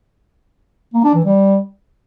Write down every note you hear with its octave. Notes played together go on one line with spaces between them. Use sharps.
A#3
D4
E3
G3